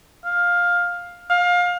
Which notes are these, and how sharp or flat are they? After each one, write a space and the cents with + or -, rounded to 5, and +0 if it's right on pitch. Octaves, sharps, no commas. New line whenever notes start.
F5 +10
F5 +25